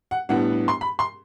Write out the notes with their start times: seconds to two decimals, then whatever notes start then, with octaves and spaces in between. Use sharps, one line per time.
0.11 F#5
0.29 A2 G3 B3 D4 F#5
0.68 C6
0.81 B5
0.99 C6